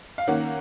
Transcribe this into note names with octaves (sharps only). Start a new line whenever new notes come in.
F5
D#3 A#3 C#4 F#5